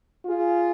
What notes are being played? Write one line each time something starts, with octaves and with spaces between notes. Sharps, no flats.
F4 G#4